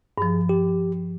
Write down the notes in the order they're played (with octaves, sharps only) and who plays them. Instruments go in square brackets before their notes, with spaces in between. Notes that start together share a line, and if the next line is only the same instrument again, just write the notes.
[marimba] G2 F3 [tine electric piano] G#4
[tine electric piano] G4